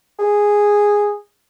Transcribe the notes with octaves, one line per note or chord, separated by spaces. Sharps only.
G#4